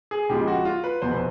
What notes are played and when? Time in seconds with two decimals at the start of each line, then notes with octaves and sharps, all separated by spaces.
0.11 G#4
0.29 C#2 C#3 F3 G#3 G4
0.47 F#4
0.65 F4
0.84 B4
1.02 F1 E2 B2 C5
1.11 B4